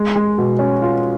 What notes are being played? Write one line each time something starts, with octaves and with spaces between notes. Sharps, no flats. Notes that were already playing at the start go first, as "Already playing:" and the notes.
Already playing: G#3
G#3
B2
C#4
F4